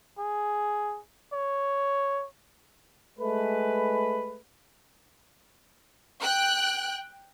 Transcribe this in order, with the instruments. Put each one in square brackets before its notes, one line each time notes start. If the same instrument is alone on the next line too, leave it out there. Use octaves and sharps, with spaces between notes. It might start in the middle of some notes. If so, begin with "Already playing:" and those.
[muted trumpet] G#4
C#5
[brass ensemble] G#3 A3 B4
[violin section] G5 F#6